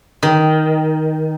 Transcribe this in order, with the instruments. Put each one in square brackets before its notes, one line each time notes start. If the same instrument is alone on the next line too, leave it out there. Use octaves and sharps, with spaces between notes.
[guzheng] D#3